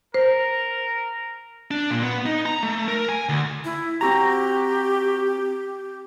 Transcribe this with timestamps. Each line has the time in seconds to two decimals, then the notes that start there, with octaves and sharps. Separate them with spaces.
0.14 A#4 C5
1.71 D4
1.90 A#2
2.03 B3
2.26 D#4
2.46 A#5
2.63 A3
2.88 A#4
3.09 G#5
3.29 D2
3.65 E4
4.01 C4 F#4 G4 A#5